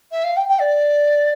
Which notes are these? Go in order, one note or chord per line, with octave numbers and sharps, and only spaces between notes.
E5
F5
G5
G5
D5